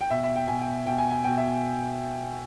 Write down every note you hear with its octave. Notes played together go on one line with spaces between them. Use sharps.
G5
B2 E5
E5
G5
B2 G#5
G5
B2 G5
G#5
G#5
B2 G5
E5